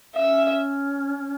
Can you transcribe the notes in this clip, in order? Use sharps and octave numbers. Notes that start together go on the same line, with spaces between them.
C#4 E5